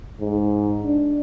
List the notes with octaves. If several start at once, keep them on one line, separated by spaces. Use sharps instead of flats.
G#2
D4